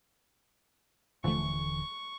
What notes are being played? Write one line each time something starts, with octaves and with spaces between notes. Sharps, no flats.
D#1 D3 E3 F3 A3 C#6